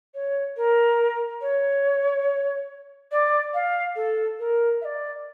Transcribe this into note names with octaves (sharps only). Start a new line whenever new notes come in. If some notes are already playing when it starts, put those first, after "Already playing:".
C#5
A#4
C#5
D5
F5
A4
A#4
E5
D5